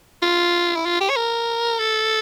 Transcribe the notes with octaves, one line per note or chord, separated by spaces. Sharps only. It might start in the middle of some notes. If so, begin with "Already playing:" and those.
F4
E4
F4
G4
C#5
A#4
A4